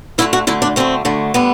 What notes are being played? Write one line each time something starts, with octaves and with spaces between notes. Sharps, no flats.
D2 D3 A3 E4
F#4
D2 D3 A3 E4
D4
D2 D3 A3 C4
D2 D3 A3
D3 G3 B3